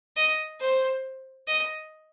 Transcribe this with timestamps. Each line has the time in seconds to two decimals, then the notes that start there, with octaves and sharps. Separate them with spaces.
0.17 D#5
0.60 C5
1.48 D#5